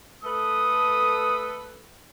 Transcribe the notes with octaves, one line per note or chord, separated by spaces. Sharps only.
A3 A4 B4 D#6